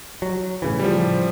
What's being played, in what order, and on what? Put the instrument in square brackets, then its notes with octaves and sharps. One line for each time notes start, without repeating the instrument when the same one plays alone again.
[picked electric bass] F#3
A2 C#3 E3
[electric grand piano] F3 G3